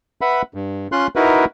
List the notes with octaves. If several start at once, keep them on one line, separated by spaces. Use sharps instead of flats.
B4 E5 F#5 B5
G2
C#4 F4 C6 F#6
D#4 E4 F#4 A#4 B4